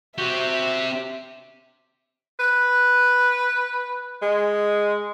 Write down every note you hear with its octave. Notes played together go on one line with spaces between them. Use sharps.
C4 F#4 G4 E5
B4
G#3